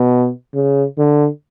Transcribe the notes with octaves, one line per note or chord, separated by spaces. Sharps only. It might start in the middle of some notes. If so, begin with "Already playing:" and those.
Already playing: B2
C#3
D3